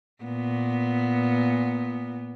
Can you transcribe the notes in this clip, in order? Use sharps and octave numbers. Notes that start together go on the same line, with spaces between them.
A#2 B3